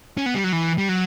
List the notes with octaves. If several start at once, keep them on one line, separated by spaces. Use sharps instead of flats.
C#4
B3
G3
F#3
E3
G3
F#3